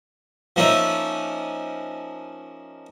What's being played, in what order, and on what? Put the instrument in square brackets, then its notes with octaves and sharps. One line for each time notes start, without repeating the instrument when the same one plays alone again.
[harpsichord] F3 A#3 C#4 D#4 E5